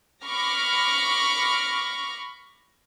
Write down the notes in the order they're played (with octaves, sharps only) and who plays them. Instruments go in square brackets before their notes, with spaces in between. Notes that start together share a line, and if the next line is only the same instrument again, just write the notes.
[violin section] B5 C#6 D6 F6 A#6